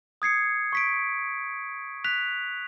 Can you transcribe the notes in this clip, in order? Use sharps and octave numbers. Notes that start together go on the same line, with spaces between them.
D#6 G#6 C7 C#7
C#6 B6 D7
F#6 B6 F7